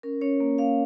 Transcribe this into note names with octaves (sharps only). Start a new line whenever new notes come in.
C#4 A#4
C#4 C#5
A#3
A#3 F5